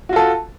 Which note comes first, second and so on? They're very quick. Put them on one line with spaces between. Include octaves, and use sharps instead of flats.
F#4 F4 A4